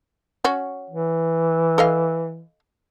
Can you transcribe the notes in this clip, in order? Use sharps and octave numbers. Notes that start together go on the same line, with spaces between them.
C#4 F#4
E3
A4 D#5 F5